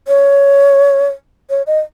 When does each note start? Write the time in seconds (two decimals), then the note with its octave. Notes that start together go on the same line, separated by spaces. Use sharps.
0.08 C#5
1.50 C#5
1.67 D#5